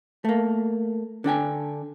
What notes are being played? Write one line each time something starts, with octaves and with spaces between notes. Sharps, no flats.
A3 A#3
D3 D4 G5 G#5